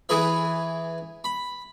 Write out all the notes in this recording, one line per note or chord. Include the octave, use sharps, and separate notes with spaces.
E3 G#4 B4 E5
B5